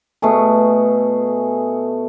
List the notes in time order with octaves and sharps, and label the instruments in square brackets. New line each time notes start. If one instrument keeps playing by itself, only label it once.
[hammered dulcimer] B2 A3 G#4